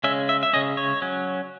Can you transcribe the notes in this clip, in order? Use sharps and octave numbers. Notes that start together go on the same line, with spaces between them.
C#3 G#3 C#4 E5
E5
E5
C#3 G#3 C#4 D#5
C#5
F#3 C#4